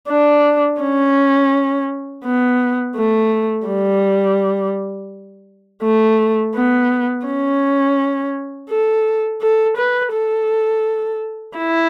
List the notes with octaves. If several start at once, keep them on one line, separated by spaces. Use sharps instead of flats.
D4
C#4
B3
A3
G3
A3
B3
C#4
A4
A4
B4
A4
E4